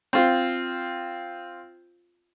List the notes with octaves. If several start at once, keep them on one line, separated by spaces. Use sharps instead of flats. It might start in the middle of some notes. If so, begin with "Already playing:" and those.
C4 F4